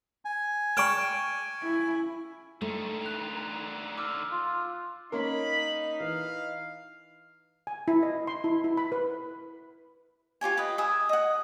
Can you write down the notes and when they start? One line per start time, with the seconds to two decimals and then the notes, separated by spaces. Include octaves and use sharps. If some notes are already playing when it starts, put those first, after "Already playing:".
0.25 G#5
0.77 D5 G5 A5 C#6 F6
1.63 E4
2.61 D3 D#3 A3
3.02 F#6 F7
3.97 D6 E6 F6
4.32 F4
5.12 A#3 C#4 D#4 A#4 B5
6.00 E3 F5
7.67 G#5
7.88 E4
8.03 D#5
8.27 C6
8.44 E4
8.64 E4
8.77 B5
8.92 B4
10.41 F4 G4 C#5 G#5
10.57 B4 D#5 G5
10.78 E5 G#5 D#6
11.09 D#5 F#5